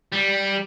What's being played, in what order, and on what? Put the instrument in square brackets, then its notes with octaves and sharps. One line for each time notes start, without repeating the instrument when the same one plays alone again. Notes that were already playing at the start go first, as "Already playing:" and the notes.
[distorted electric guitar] G3